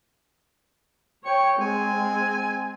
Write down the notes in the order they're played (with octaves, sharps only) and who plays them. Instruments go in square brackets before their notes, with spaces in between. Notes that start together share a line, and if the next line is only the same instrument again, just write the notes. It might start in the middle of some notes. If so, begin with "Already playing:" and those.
[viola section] C#5 G5 [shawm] C#6
[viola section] G#3 C4 [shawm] G#5